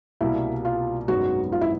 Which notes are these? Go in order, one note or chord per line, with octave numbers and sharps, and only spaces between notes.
C2 B2 G3 A#3 E4
F4
G#1 F#2 D#3 G#3 B3 F#4
F4
E4